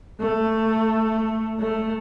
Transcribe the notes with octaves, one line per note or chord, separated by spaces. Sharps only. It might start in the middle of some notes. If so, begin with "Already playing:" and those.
A3
A3